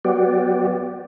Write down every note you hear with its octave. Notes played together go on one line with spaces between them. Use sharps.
F#3 B3 F#4 G4 D5